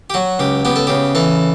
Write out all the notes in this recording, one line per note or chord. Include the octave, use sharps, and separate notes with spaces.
G4
F#3 F#4
C#2 G4
B3 G4
A4
C#3 G4
E3 A4